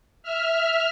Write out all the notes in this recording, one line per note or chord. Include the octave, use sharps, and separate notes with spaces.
E5 F6